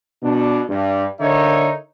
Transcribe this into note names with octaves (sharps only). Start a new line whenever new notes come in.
B2 D4
G2
D3 D#4 A#4 C#5 E5